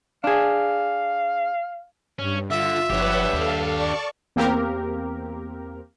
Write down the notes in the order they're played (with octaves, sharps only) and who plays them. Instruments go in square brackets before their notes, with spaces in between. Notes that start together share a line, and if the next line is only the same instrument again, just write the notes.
[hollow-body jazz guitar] D4 G#4 [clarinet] F5
[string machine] G2 [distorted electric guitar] C#4
[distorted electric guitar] D3 [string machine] F4 [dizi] E5
[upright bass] F#1 F3 [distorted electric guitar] D4 G4 [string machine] B4 C#5 F#5
[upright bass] D#2 [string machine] A4 F5
[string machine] D5 A5 C#6
[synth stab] E2 A#3 C4 G4 A#4